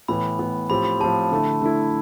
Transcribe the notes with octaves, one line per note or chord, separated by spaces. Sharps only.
A2 E3 B3 B5
A2 E3 B3
A2 F3 C4 G4 B5
B5
A2 F3 C4 G4 A5
D3 A3 E4
D3 A3 E4